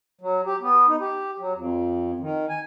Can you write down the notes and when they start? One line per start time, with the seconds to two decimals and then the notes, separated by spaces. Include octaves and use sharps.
0.21 F#3
0.46 G4
0.61 B3
0.88 D#4
1.00 G4
1.40 F#3
1.55 F2
2.20 D#3
2.49 G#5